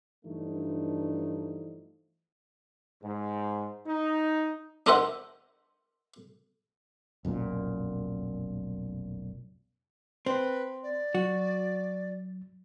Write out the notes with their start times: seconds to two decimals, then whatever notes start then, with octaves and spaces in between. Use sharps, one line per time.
0.25 G2 E3 F3 A3 D4 D#4
3.02 G#2
3.86 D#4
4.86 D4 D#4 A#4 C5 E5 F#5
7.25 F1 B1 F#2 A#2
10.26 C4 B4
10.83 D5
11.15 F#3 F#4